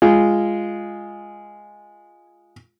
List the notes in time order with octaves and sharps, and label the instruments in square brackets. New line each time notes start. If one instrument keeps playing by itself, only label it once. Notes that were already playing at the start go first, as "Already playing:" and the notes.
[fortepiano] G#3 F4